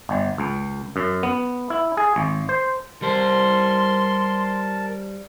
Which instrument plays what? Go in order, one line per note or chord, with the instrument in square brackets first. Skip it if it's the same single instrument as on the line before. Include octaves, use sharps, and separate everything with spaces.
[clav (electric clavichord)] G1
C#2
F#2
B3
E4
G#4
G#1
C5
[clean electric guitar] G3 C5 [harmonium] A#4 A5 [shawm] C6